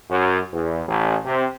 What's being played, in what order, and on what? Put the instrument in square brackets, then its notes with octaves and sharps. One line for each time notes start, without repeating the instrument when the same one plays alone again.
[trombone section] F#2
E2
A1
C3